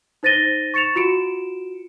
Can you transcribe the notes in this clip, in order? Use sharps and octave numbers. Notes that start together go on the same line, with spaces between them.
D#4 C5 A6 A#6 D#7 G7
C#6 A6 C#7 E7 F7
F4 F#4 C#7 D7 E7